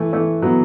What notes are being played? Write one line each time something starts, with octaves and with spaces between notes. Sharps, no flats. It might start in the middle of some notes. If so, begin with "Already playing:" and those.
Already playing: E3 A3
E3 A3
F#3 B3